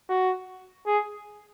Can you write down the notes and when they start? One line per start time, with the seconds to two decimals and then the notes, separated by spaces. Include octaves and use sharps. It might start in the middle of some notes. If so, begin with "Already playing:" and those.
0.09 F#4
0.86 G#4